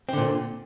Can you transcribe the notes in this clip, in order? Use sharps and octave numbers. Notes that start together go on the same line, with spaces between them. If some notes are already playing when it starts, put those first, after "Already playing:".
A#2 D3 C4